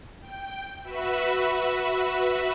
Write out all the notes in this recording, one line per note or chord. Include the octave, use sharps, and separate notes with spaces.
G5
F#4 B4 E5 B5 E7